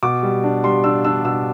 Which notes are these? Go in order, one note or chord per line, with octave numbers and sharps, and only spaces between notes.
B2 D6
G3
D4
G3 C6
D4 E6
D4 E6
B2 E6